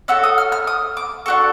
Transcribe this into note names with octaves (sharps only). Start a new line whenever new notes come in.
C#4 F#4 A4 E6
D#6
F6
F6
D#6
D6
D4 F#4 A4 C#6